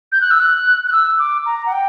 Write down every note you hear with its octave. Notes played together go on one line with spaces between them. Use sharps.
G6
F#6
E6
F#6
F#6
E6
D6
A#5
F#5
G5